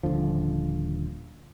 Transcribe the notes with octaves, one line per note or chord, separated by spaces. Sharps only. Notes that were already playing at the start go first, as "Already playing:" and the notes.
D#1 A#1 D3 F3